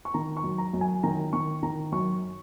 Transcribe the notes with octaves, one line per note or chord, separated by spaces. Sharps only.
C#6
D#3 A#5
C#6
F#2
A#5
F#2
G#5
D#3 A#5
D#3 C#6
D#3 A#5
F#2 C#6